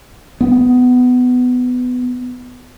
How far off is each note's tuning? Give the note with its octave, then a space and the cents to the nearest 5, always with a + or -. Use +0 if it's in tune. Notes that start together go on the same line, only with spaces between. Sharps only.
B3 +15